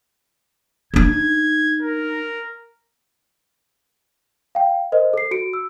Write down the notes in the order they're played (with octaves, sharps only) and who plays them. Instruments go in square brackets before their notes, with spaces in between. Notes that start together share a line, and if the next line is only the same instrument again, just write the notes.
[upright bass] D4 D#4 [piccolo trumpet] G#6
[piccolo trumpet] A#4
[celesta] F5 G5
A#4 C5 D#5
A4 C7
F#4 C#7 D7
E6